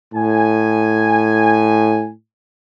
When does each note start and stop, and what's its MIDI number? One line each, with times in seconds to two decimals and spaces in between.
0.13 2.09 45
0.13 2.09 80